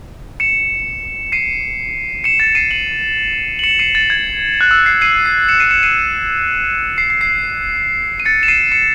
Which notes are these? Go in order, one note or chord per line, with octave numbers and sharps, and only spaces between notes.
C#7 E7
C7 D#7
C#7 E7
A6 C#7
C7 D#7
D#7 F#7
F#7
C#7 E7
C7 D#7
A6
G#6
F#6
E6
C7
C7 D#7
C7
C#7 E7
C7 D#7
C#7 E7
C7 D#7
C7
C7
C7
D#7
A6 C#7
E7
C7 D#7
C#7 E7